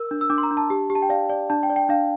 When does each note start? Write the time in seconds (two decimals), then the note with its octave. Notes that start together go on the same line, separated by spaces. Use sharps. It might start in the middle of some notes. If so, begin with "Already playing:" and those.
Already playing: A#4 E6
0.11 D4
0.21 E6
0.30 D4 D6
0.38 C6
0.43 A#5
0.51 D4
0.57 A5
0.70 G4
0.90 G4
0.95 A5
1.02 G5
1.09 D5 F5
1.29 D5
1.50 D4 A5
1.63 G5
1.70 D5
1.76 G5
1.89 D4 F5